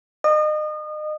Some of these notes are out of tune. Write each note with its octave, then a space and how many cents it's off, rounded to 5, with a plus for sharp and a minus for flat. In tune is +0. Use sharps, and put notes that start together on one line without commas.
D#5 -35